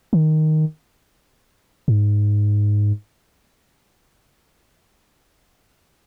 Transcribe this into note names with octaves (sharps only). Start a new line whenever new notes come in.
D#3
G#2